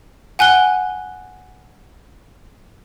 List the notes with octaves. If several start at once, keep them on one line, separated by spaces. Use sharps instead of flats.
F#5 G#5 F#6 G7